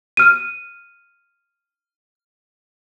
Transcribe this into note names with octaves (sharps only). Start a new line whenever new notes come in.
F6 D#7